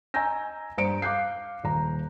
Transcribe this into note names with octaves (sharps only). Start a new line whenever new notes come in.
D#5 G#5 A#5 E6 G6 A#6
G2 C5 A#5 C#7 D7
F5 D6 F#6 G6 C7
D#1 A#5